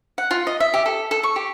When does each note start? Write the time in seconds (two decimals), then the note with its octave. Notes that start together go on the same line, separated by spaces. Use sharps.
0.18 F#5
0.31 F4
0.47 D#5
0.60 E5
0.74 G4
0.86 A4
1.11 A4
1.23 C#6
1.36 G4